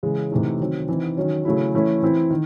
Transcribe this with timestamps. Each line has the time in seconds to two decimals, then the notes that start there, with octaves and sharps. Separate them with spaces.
0.03 C#3 E3 G#3
0.31 C3 E3 A3 D#4
0.60 D#3 F#3 C4
0.89 E3 C4 D#4
1.17 D#3 F#3 C#4
1.45 C#3 F#3 A3 C#4 E4
1.74 E3 A3 C#4 E4
2.03 E3 C4 E4
2.30 D#3